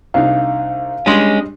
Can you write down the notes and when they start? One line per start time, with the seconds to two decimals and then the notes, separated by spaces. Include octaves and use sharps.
0.14 C2 D4 D#4 F5
1.06 G3 G#3 C#4 D4 C6